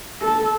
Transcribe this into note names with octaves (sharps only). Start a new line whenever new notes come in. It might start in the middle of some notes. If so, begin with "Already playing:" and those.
A4